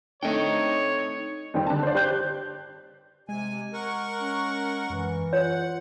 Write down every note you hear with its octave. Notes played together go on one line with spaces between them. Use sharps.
A3 C4 D4 D#4 C#5 D#5 G5
F2 D#3 G3 C4
D3 A5
C5 D5
G4 C5 D5 F#6 G6
C3 G#3 G#5
A#4 F#5 C#6
C#4
F#2 E3
F4 C#5 F#5